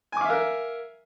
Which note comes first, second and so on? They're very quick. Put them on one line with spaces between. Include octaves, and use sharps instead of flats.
G#5 D6 F5 E5 A#4